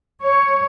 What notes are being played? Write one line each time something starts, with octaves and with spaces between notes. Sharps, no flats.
C#5